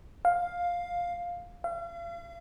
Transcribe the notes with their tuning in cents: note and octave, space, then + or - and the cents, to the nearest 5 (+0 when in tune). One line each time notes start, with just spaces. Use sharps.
F5 +10
F5 -40